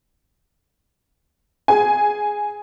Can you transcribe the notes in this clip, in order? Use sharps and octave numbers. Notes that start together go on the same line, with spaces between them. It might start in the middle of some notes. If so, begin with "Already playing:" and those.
G#4 G#5